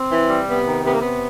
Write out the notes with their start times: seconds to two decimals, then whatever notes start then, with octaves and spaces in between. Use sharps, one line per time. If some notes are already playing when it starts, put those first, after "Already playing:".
Already playing: C4
0.10 E3
0.29 G3
0.47 C3 B3
0.65 D#3
0.83 C3 B3
0.92 A#3
0.99 C3 B3